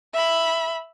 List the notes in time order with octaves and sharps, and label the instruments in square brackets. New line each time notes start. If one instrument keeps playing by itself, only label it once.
[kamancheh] E5 B5